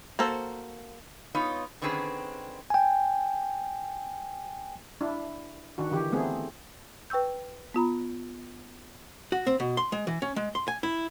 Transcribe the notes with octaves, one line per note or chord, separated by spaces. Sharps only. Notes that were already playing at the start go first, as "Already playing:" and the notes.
A#3 F#4 A4 C5
B3 D#4 F4 C#5
D3 D#3 C4 C#4 G#4 B4
G5 G#5
D4 E4
D#3 D4 F#4
D3 E3 G4
A3 B3 C4 G#4
B4 G5 C#6 E6 G6
B3 F4 A#5 B5
F#4
C4
B2
C6
G#3
E3
C#4
G#3
C6
G#5
E4